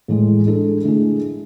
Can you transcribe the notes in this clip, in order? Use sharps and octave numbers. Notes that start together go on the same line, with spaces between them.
A2 E3 G#3
G#3 D4 A4
D3 A3 E4 G#4